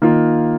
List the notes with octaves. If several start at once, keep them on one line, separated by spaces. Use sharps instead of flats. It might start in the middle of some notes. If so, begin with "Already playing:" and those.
D#3 A#3 F4